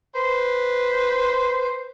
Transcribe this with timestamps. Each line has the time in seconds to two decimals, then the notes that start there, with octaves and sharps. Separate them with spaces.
0.16 B4 C5